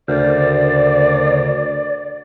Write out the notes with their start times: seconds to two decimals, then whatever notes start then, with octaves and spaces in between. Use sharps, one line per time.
0.08 D2 C#3 A#4 C5 D5